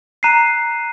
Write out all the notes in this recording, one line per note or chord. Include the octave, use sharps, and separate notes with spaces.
A#5 F#6 C7 D#7